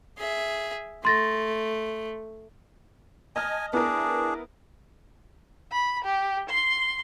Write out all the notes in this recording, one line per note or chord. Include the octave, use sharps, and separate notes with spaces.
G#4 E5
A3 C6 A6 A#6
D#5 G#5 A5 F6
B3 D4 E4 G#4 A#4
B5
G4
C6